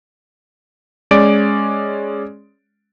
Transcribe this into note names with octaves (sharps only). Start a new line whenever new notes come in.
G#3 C#4 D5 D7